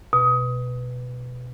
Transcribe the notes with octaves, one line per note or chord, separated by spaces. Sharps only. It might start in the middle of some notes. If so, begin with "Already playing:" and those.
B2